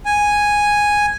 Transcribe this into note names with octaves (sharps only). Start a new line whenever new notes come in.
G#5